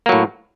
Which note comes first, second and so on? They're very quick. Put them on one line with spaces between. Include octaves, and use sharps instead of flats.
A#3 F#3 A2